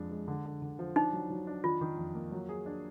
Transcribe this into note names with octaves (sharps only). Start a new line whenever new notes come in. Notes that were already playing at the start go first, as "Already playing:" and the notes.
Already playing: F2 G#3 D4
G#3
D3
D3
D3
F3
D4 D#4
F#3
F#3
D4
D#3 F4
D#3
F2
A#3
F#3
G#4
D4